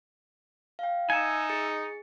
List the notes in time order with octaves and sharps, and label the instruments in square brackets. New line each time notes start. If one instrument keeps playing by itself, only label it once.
[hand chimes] F5 G5
[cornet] D#4 [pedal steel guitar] E5 G#5 [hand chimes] C#7
[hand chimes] G#4 A6 C#7